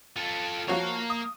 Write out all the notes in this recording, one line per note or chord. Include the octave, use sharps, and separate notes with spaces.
F4 A4
F3 A#3 F#4 C#5 F5
D#6